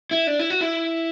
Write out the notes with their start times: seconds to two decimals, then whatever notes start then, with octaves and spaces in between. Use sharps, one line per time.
0.11 E4
0.27 D4
0.39 E4
0.50 F#4
0.61 E4